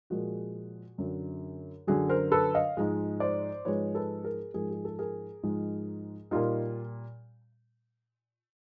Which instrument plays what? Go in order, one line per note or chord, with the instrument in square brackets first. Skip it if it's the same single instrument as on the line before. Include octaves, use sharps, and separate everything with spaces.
[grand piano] A#2 F3 G#3 F#4 G#4
F#2 D3 F#3
F#2 D3 F#3 F#4 G#4
A#4 C5
A4 B4
D#5 F5
G#2 F3 G#3
C5 D5
G#2 F3 G#3 B4 C#5
A4 B4
G#4 A#4
G#2 F3 G#3 G#4 A#4
G#4
A4
G#4 A#4
G#2 F3 G#3
A#2 G3 D#4 F4